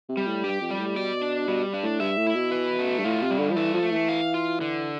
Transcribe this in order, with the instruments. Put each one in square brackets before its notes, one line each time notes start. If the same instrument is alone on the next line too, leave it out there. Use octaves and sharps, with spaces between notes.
[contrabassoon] C3
[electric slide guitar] G3
[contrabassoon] A2
[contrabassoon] G2 [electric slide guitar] G4
[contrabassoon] F2
[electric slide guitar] G3
[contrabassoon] A2
[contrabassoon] B2 [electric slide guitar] D5
[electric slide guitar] D4
[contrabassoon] B2 [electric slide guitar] G3
[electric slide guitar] D4
[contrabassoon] A2
[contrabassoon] G2 [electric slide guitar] E5
[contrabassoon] A2
[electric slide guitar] E4
[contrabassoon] B2
[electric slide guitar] B4
A3
[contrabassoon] G2
[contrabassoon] A2 [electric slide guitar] F4
[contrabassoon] C3
[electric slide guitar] G3
[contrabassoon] D3
F3
[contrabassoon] E3 [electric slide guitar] A4
[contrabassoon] F3
[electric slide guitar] A3
[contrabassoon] E3
[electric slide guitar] F5
F4
D3